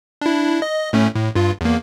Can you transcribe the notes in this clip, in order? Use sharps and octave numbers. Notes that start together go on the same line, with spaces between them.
D4 E4
D#5
A2 A3 C#4
A2
G2 F4
E2 A#3